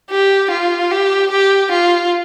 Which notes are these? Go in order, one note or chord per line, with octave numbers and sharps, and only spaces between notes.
G4
F4
G4
G4
F4